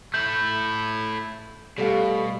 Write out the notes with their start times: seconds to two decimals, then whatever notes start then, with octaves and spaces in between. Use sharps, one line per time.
0.14 A3 E4 G6
1.78 B2 G3 A3 F5